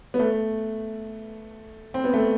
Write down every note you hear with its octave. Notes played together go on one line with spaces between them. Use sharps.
B3
A3
C4
B3
A3